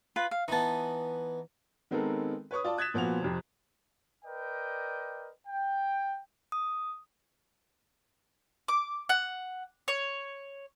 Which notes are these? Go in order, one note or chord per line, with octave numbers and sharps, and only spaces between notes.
F4 B4
F5
E3 B3 D#4 A5
D#3 G#3 B3 C4 A4 A#4
B4 C#5 C#6 D#6
F4 D5 A5
D#6 F#6 G#6 A6 B6 E7
A#2 F3 B3 F#4 F7
F2 C3
A#4 B4 D5 D#5 G5
G5
D#6
D6
F#5
C#5